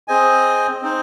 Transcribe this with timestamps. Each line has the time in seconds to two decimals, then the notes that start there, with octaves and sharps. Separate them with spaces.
0.08 C4 G#4 C5 D#5 G#5
0.82 C4 D#4 C5